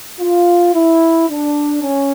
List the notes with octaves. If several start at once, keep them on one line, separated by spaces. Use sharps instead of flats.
F4
E4
D4
C#4